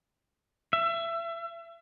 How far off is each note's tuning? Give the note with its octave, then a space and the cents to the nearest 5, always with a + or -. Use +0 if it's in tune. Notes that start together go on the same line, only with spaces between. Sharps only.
E5 +30